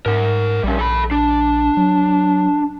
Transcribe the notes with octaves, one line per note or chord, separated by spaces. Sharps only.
G#2 A#4 F#5
A#1 G3 C#4
A4 B5
D4
F#3